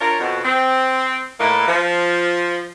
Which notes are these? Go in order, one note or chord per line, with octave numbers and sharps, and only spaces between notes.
D4 F4 A#4 C#5
F2 B2
C4
A2 A#3 D#4 E4 B4
F3